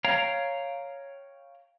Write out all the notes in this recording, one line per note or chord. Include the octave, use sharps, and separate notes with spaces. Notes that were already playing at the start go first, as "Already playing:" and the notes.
C#5 F5 G5 A#5